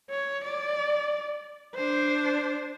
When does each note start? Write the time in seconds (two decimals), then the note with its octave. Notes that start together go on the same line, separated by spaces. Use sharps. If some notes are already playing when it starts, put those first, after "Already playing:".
0.10 C#5
0.44 D5
1.76 D4 C5